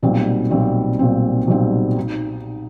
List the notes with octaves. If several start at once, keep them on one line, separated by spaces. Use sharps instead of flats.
B1 A#2 G3 C4
B1 A#2 G3 C4
B1 A#2 G3 C4
B1 A#2 G3 C4
D#4